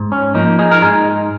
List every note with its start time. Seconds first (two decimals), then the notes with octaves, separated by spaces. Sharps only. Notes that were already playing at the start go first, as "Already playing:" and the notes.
Already playing: G#2
0.12 C#4
0.34 F3 A#3 D#4
0.59 D#4 G#4
0.71 A#4
0.82 G#2 D#4 G#4